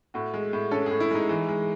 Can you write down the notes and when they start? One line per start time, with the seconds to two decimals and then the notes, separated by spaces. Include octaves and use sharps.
0.14 A2 F#4
0.34 G#3
0.53 A2
0.71 C#4 A4
0.86 A2 G#4
1.00 E4
1.11 G#3 D#4
1.29 E3
1.49 G#3